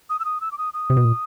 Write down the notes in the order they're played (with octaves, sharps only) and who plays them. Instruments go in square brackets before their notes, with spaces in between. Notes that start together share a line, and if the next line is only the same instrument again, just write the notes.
[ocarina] D#6
E6
D#6
E6
D6
D#6
D#6
[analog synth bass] C3
B2
A#2